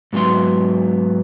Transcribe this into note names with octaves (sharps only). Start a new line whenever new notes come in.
G#2 F#3 B3 C6